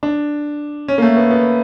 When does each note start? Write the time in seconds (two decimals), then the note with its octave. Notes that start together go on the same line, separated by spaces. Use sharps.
0.03 D4
0.88 C#4
0.98 A#3
1.02 A3
1.17 B3
1.30 B3